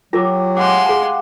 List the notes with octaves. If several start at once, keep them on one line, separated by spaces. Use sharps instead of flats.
F#3 F4 G4 A#4 D6
G#3 G4 F5 F#5 C6 D6
G#4 A#5